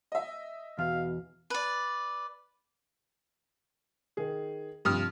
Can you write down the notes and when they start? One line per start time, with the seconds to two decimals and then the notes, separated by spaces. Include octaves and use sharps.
0.12 D#5 E5
0.79 E2 B2 F5
1.50 B4 D5
4.17 D#3 G#4
4.85 G2 C3 F3 D#6 F6